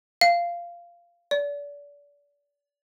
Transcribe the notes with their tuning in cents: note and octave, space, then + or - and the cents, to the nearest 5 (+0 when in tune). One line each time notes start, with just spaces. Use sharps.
F5 -10
D5 -30